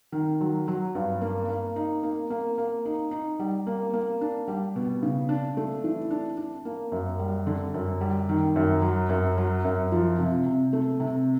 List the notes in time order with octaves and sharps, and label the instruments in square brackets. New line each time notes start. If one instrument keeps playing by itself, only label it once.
[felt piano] D#3
F#3
F#3
G2
A#3
A#3
D#4
A#3
A#3
A#3
D#4
D#4
G3
A#3
A#3
D4
G3
B2
C#3
D4
A3
E3
D4
D4
A#3
F#2
G3
D3
F#2
G3
D#3
F#2
F#3
F#2
F#3
F#2
F3
C3
C3
A3
C3